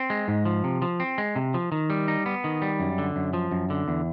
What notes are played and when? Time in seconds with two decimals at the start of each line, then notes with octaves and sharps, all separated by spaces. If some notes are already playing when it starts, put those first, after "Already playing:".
Already playing: C4
0.10 G#3
0.28 G#2
0.45 F3
0.64 C3
0.82 F3
1.00 C4
1.18 G#3
1.36 C3
1.54 F3
1.72 D#3
1.90 G3
2.08 D#4
2.26 B3
2.44 D#3
2.62 G3
2.80 F#2
2.98 D3
3.16 F#2
3.33 F3
3.51 F#2
3.70 D3
3.88 E2